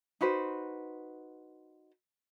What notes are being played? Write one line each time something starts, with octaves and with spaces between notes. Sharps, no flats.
D#4 F#4 B4 C5